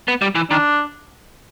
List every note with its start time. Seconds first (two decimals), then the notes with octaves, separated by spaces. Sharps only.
0.08 B3
0.22 G3
0.35 E3
0.50 D#3 D4